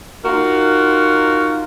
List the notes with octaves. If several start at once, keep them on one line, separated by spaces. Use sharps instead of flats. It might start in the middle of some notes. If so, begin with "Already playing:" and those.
D#4 F4 F#4 A#4